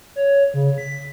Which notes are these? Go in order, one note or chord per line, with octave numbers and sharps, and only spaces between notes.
C#5
C#3
B6